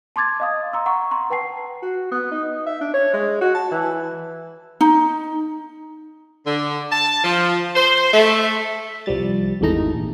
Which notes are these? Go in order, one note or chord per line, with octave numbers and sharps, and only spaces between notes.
A5 C6 D6 G#6 A6
D#5 F5 D#6
A#5 C6 E6
F#5 A#5 C#6
A#5 C6
B4 F#5 G5 A5 C7
F#4
B3
D#4
E5
D4
C#5
G#3
F#4
A5
E3
D#4
D3
A5
F3
C5
A3
C2 F3 G3 A6
G#1 E2 A3 D#4 A#5
A#1